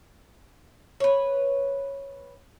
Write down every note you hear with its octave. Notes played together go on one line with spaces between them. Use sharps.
B4 C#5